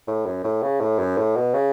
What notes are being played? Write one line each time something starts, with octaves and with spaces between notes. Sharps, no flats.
A2
F#2
A2
C#3
A2
F#2
A2
B2
C#3